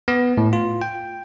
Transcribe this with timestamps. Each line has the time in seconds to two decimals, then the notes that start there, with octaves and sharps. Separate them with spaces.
0.08 B3
0.38 A2
0.53 F4
0.82 G5